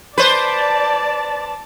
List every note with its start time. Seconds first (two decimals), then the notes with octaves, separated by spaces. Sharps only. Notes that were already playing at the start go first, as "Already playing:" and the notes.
0.18 B4 C5 D5 A5